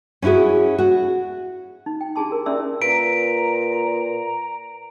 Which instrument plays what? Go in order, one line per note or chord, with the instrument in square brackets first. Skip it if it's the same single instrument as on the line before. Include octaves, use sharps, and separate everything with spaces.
[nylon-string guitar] C#4 D4 E4 F#4 G#4
F#4
[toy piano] D#4
G5
D4 E4 G4 G#4 A5 C6
A#4
C#4 E4 D5 E5 C6 E6
[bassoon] A#2 [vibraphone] B4 [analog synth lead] A#5 [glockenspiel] D7